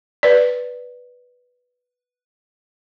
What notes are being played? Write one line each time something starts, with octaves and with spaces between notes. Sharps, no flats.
B4 D5